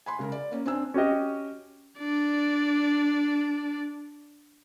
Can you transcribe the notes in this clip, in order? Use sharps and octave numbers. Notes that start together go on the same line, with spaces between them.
G#5 B5 C6
C#3 G#3 A#4
D5
A#3 C#4
C4 D4 G#5 E6
C#4 F#4 G4 D#5
D4 D5